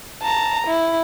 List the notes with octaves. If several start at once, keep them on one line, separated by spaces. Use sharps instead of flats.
A5 A#5
E4